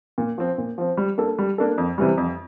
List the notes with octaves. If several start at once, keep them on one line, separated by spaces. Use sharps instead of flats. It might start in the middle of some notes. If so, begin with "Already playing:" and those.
A#2
F3 C4
A#2
F3 C4
G3
A#3 D4 A4
G3
A#3 D4 A4
F2
C3 E3 G3
F2